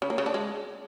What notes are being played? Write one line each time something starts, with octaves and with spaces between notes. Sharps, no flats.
C#3
A#3
C#3
D4
G#3